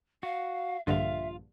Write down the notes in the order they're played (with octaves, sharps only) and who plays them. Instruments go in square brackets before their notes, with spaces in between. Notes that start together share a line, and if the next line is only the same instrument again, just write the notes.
[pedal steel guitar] F#4 [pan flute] F5
[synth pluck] A#1 G2 D3 [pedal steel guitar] F4 F5 [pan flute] E5